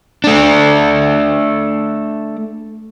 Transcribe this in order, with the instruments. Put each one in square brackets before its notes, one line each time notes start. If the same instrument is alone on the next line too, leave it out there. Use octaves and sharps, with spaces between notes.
[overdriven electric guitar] A3 D4